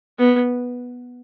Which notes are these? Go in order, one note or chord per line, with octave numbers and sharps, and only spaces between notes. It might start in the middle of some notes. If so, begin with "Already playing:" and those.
B3